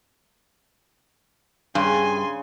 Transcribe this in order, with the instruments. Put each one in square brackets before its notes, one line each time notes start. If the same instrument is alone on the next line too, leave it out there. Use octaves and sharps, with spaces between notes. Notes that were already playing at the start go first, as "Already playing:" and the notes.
[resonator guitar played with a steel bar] G2 [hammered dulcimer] C#3 [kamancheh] G#5 C6